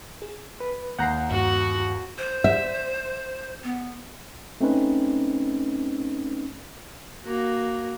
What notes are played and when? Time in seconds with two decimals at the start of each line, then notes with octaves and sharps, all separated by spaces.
0.22 G#4
0.60 B4
0.99 D#2 F#5 A#5 G6 C7
1.31 G2 F#4
2.18 C5
2.44 E5
3.64 B3
4.61 A3 C4 C#4 D#4 B4
7.25 A#3 F#4